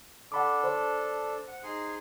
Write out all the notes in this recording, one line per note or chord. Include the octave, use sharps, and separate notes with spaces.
D4 A4 F#5 B5 D6
C5
F#5
D#4 G#4 C6